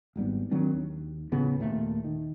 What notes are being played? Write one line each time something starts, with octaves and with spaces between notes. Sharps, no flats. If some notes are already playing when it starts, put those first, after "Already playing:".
G#1 G#2 G3 B3
D#3 F#3 C4 D4
D#2
A#1 A2 C#3 B3
D#2 A#2 A3 A#3
D#3